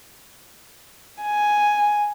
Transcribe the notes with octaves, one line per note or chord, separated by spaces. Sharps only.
G#5